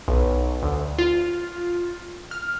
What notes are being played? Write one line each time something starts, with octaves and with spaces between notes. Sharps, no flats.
B1
D2
F4
F6